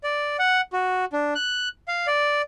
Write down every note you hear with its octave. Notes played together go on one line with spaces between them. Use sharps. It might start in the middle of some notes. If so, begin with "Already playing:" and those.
D5
F#5
F#4
D4
F#6
F5
D5